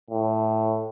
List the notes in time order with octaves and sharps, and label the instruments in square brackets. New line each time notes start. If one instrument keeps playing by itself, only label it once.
[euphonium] A2